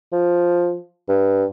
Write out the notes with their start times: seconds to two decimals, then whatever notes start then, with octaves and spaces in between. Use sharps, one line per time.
0.12 F3
1.09 G2